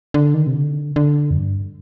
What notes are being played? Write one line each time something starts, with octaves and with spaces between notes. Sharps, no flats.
D3
D#3
C3
D3
D3
F2
G2